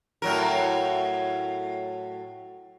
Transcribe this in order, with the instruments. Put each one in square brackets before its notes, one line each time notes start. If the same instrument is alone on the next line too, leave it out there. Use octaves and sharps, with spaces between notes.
[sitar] A2 F#3 A#4